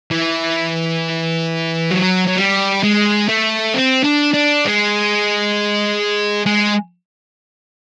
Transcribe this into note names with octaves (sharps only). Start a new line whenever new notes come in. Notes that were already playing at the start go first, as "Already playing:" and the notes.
E3
F#3
F#3
G3
G#3
A3
C4
D4
D4
G#3
G#3